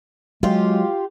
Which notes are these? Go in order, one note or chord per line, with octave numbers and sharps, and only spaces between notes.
F#3 G#3 F4 G4